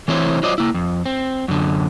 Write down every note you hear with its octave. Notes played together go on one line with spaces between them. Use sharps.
E3 A3 C4 E4 C5 C#5
F#3 F4 C5 D5 D#5
A#3 E4
F2
C4
F#2 D3